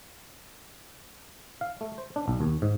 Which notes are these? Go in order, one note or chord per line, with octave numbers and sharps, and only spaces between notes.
F5
A3
C5
D4
B1
D#2
G#2